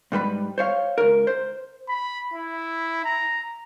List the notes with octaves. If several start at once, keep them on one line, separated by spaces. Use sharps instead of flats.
G#2 G3 B4 B5
C5 C#5 F5
C#2 A#4
C5
B5
E4
A#5